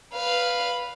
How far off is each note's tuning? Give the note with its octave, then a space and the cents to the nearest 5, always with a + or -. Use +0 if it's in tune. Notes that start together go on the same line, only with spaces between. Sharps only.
B4 +0 F5 +0